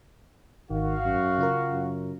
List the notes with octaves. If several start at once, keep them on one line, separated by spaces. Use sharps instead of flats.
G#1 D#3 F#4 F5
F#2
C#3 F4 A#4
F#2